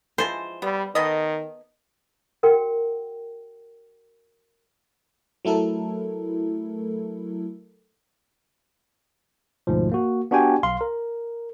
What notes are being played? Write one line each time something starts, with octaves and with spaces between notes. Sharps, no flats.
E3 F3 G#3 C5
G3 B3
D#3 B3 A4 D#5
F#4 A#4 F#5 G5
F#3 A3 E4 A4 A#4
D2 G#2 B2 F3
A#3 F#4
B3 D4 F#4 G4 G5 G#5
B1 F5 C6
A#4